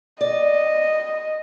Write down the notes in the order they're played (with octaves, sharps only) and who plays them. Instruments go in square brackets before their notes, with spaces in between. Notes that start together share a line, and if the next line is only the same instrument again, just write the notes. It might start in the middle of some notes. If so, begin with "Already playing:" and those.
[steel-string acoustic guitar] D5 [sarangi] D#5